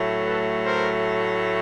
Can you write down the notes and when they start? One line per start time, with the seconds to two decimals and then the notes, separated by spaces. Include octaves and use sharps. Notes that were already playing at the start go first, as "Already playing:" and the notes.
Already playing: A2 F#3 A3
0.26 A4 B4
0.64 A#4 C5